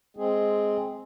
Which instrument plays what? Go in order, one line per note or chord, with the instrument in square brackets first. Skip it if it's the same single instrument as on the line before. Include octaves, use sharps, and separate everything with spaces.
[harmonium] G#3 C4 G#4